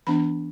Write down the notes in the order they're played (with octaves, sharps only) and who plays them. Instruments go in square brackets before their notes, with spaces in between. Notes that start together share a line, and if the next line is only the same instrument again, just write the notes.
[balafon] E3 B3 D4 B5